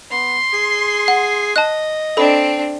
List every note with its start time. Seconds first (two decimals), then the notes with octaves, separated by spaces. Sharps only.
0.11 B3 C6
0.53 G#4
1.08 F#5
1.56 D#5 A5 F#6
2.17 C4 D4 A4 B5